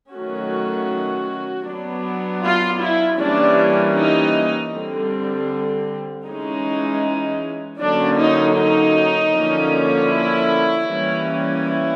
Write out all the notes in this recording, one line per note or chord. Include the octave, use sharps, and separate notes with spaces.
D#3 F#3 A3 C#4 F#4
F#3 B3 D4
F4
E4
E3 G3 A#3 C#4 D4
D#4
D3 G3 C4
E3 G#3 C#4 D#4
D3 F#3 A#3 C#4 D4
D#4
D#4
D3 F3 A#3 C#4
E4
E3 G3 A#3 C#4
E4